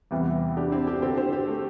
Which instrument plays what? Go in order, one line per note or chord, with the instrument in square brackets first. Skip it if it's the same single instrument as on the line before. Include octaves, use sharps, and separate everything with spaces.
[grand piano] E2 C3 E3 G3
[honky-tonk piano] D4 G4
C4 E4
D4 G4
[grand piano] D3 C4 A4 [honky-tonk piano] G4 C5
[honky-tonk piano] G4 C5
G4 C5
A3